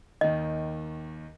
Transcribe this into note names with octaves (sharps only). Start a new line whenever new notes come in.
D#2 D#3 D#5